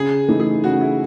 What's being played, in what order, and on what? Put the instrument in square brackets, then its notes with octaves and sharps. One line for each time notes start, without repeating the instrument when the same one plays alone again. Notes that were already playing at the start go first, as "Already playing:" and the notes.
Already playing: [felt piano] C#3 [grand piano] G#4
[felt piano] E3 A3 D#4
[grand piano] G#4
[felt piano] C#3 [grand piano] F#4
[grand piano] E4